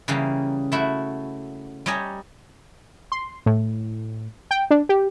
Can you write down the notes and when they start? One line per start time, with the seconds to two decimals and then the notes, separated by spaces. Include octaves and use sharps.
0.08 C#3 E3 G3 A#3
0.72 A3 E4 F#4
1.86 G3 G4 C#5 D#5 G#5 A#5
3.12 C6
3.46 A2
4.51 G5
4.71 D4
4.89 G4